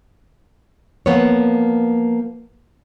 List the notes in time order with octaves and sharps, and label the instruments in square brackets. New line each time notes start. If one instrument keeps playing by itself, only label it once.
[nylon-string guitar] F3 A#3 B3 F4 C#5